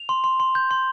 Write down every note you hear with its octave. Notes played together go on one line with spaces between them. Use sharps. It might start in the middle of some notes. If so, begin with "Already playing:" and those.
Already playing: F7
C6
C6
C6
G6
C6